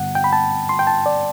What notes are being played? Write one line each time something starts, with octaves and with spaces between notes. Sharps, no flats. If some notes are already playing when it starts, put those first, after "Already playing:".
Already playing: G2 D3 G3 B3 F#5
G5
B5
A5
C6
G5
A5
D5